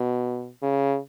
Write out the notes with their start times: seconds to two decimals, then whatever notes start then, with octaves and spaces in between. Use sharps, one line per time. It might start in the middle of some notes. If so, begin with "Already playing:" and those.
Already playing: B2
0.63 C#3